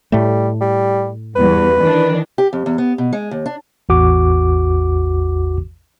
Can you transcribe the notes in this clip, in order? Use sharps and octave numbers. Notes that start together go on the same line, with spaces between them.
A2 G3 A3
G3
E2 G2 B4
D#3 E3 D4
G4
F2
E2
B3
B2
G#3
D#2
D4
A1 E2 F#4 D6